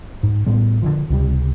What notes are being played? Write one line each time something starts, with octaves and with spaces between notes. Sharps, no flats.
G#2
A2 G3 B3
D3 D#3 F3
C#2 C3 G3